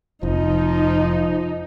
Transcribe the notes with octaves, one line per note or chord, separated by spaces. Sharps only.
F1 F3 D#4